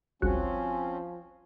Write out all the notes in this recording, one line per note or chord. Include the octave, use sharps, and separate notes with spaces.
G1 C#2 F3 C4 C#4 F#4